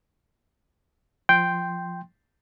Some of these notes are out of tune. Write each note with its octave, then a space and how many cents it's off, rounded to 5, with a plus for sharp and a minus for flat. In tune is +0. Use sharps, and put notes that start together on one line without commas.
F3 +0 G5 +0 C6 +0